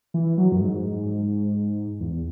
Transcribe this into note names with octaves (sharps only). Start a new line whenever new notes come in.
E3
F#3
F#2
G#2
E2